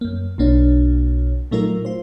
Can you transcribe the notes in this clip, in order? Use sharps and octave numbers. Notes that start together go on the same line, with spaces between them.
F#2 A#3
B1 B2 A#3 D4 C#5
A#2 F#3 A3 D#4 F4 A#4
F4 C5